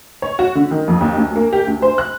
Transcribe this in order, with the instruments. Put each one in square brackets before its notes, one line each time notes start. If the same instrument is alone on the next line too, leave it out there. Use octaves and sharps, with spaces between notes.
[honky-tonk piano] C#5
F#4
D3
D#3
F2
D#2
D2
A#3
G4
D2
C5
F#6